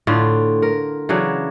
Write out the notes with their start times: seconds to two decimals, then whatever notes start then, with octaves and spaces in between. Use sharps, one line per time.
0.07 A2 D3 F4 D5
0.62 A#4
1.09 C#3 E3 F#3 D4